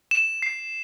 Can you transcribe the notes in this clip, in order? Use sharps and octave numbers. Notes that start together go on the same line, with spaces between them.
E7
C7